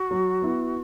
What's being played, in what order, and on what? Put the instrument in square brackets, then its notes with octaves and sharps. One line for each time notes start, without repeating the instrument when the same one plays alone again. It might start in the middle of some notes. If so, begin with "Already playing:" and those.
Already playing: [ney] F#4
[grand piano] F#3
B3 E4